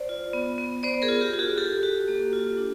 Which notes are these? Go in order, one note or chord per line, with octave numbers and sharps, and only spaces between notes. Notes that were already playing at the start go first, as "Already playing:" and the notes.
Already playing: C5 D5
F4
B3
B3
B3 C5 D5
G#4 A#4
F4
G4
F4
F#4 G#4
F#4 G4 A4
F#4
A#3
F4
D4